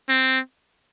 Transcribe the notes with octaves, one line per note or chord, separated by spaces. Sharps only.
C4